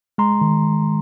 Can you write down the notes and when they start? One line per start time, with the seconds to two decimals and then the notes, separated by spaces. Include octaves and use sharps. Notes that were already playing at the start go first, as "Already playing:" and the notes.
0.18 G#3 A#5 C6
0.41 D#3